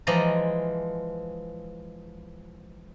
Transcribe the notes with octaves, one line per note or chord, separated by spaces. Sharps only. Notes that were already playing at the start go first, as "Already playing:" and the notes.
E3 F3 G#3 D5 D#5 A#5